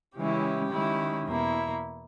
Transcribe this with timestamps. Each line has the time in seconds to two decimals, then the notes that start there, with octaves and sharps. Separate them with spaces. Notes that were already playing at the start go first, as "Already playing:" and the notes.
0.17 C#3 E3 G#3 C#4 E4 G4
0.72 D#3 G#3 C#4 E4
1.27 E2 B2 A#3 E4